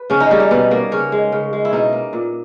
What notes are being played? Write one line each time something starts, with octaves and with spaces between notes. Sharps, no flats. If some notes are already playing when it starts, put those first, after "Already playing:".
Already playing: B4
C#3 C#4
D#4
G3 A#3 C#4
D#4
B2 B3
A#3
C#3 C#4
G#3
C#3
G#3
E4
B2 D#4
A#3
A#2